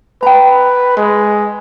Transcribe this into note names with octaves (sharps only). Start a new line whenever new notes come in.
B4 G5 A#5
G#3